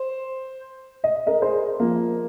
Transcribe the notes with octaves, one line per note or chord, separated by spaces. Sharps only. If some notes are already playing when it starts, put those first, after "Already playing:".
Already playing: C5
D#5
A#4 D#5
G#4 C5
F3 A#3